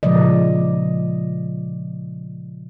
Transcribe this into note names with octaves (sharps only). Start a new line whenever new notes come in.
A#2 C#3 F3 G#3 D5 D#5